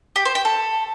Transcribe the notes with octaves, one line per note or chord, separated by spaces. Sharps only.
G4
C5
G5
A4